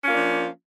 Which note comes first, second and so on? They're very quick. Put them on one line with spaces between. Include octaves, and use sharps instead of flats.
C#4 F4 A#3 D4 F3